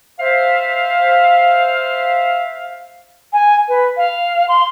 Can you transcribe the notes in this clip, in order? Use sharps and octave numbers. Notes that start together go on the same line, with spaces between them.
C5 E5 F5
G#5
B4
F5
C6